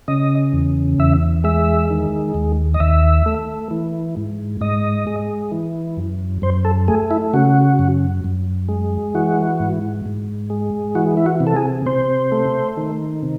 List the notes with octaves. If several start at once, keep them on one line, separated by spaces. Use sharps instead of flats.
C#3 D#5
E2
E2 E5
G#3 E5
D#3
D#2
D#5
D#2 E5
A3
E3
G#2
G#2 D#5
G#3
E3
F#2
F#2 C5
A4
A3 G#4
E4
C#3 F#4
F#2
F#2
G#3
E3 F#4
G#2
G#2
G#3
E3 F#4
E4
F#4
C3
A4
G#4
C3 C5
A3
D#3
C3